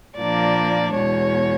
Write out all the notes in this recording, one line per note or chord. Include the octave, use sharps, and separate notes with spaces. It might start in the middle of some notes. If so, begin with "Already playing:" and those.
A#2 F3 A#3 D4 D5
E2 B2 G#3 C#5